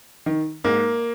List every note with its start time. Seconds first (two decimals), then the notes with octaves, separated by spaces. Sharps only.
0.26 D#3
0.64 G#2 A#3